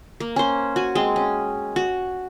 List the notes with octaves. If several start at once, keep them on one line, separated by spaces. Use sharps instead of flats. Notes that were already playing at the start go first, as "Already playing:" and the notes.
A#3
C#4 C5
F#4 G#5
G#3 C4
C#4
F#4